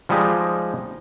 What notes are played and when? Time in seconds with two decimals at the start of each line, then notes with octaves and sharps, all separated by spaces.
0.09 F3 G3 G#3 D#4